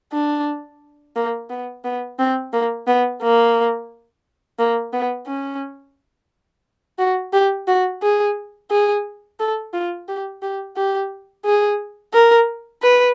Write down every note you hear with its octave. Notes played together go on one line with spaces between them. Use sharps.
D4
A#3
B3
B3
C4
A#3
B3
A#3
A#3
B3
C#4
F#4
G4
F#4
G#4
G#4
A4
F4
G4
G4
G4
G#4
A#4
B4